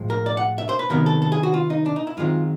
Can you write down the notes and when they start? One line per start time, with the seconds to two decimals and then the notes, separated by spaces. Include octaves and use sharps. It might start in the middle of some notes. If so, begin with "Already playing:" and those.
Already playing: A2 F3 G#3
0.10 A#4
0.26 D5
0.37 F#5
0.58 E5
0.69 C5
0.79 B4
0.90 C3 D#3 F#3 B3 A#4
1.06 A4
1.22 A4
1.32 G#4
1.43 F#4
1.54 F4
1.70 D#4
1.86 D4
1.96 D#4
2.07 E4
2.17 F#2 D#3 G#3 C4 F4